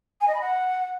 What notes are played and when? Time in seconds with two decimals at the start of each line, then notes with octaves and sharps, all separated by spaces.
0.21 G#5
0.28 D#5
0.34 B5
0.41 F#5